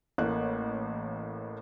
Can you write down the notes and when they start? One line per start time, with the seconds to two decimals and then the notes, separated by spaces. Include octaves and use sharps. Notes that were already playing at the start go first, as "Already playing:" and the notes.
0.18 A1 A2 A#3 F#6